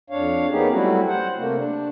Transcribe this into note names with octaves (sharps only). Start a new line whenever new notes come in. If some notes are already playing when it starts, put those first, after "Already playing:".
F2 D4 C#5 F5
A#3 B3 C#4 D#4 G4 G#4
F#3 G3 A3 C4 E4 F#4
C5 F#5
C3 A3 A#3
D4